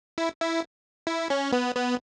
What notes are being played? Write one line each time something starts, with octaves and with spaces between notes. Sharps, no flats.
E4
E4
E4
C#4
B3
B3